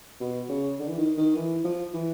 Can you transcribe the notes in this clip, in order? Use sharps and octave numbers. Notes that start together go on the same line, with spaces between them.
B2
C#3
D3
E3
D#3
D#3
E3
F3
E3